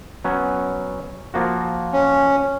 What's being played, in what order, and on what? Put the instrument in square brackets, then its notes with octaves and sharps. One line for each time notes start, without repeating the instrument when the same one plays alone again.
[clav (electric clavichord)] F#3 B3 C#4
F3 A#3 F#4
[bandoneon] C#4